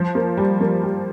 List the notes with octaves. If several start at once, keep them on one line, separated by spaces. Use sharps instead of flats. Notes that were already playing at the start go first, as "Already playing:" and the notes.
Already playing: F3
A#3
G3
A#3
G3